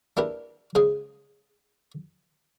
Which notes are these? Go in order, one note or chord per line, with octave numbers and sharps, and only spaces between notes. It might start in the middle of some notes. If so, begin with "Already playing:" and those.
D4 E4 G4 A#4 B4
C#3 G#3 C5 G#5 D#6